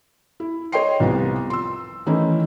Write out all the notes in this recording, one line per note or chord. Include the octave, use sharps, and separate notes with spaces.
E4
C5 C#5 D#5 G5 C6 C7
C2 F3 B3
C6 E6
D#3 E3 A3 C#4 D#4 E4